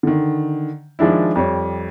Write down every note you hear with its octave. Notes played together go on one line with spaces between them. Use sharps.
D3 D#3
D#3 F3 G#3 D4 E4
F2 G3 C#5